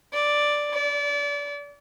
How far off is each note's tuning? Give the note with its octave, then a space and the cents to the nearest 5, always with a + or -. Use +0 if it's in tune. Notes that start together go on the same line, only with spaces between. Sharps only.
D5 +0
D5 -30